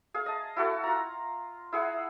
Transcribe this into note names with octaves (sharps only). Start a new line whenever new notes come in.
G#4 F5
D#5 A5
E4 F#4 A4
F4 A#5
E4 G#4 F#5